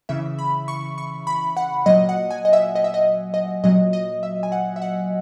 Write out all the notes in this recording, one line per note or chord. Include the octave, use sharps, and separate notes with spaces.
C#3 E3 E5
B5
C#6
C#6
B5
F#5
A#2 F#3 D#5
F#5
G#5
D#5
E5
D#5
E5
D#5
D#5
A#2 F#3 D#5
D#5
E5
G#5
F#5
E5
F#5